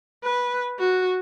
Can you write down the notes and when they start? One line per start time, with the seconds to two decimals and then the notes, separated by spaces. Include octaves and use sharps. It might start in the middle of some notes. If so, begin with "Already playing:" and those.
0.24 B4
0.79 F#4